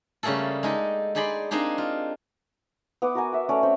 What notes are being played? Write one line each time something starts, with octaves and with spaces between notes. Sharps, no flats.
C#3 G3 A3 A#3 G#4 A4
G#3 D#4 G4 A4
D#4 G4 G#4 D5 B5 C6
A#3 C4 D4 D#4 G4 G#4
F4
B3 F#5 D6 D#6
F#4 A#4 G#5
E5 F#5
A3 C#4 C#5 D5
C4 C#4 G5 C#6